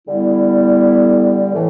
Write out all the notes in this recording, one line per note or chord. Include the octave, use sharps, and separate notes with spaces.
D3 G3 B3 E4
A2 E3